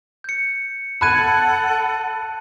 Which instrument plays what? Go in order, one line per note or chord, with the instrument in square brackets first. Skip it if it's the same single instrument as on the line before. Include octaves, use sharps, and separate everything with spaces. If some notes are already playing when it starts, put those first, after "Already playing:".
[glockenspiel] G6 C#7
[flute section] A4 F#5 [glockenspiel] A5 F#6 D#7 [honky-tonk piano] B5 G#6